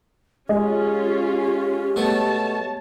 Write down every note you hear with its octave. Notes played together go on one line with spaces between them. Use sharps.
G#3 C#4 F4 G4
B2 A3 C#5 A5